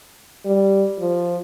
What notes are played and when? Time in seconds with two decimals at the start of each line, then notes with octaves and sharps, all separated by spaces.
0.45 G3
0.99 F3